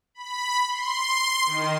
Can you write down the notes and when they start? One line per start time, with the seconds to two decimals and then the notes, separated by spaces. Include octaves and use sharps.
0.14 B5
0.69 C6
1.46 D#3